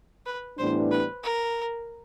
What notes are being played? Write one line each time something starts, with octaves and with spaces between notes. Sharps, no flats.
B4
A2 E3 G3 B3 D4 C5
B4
A#4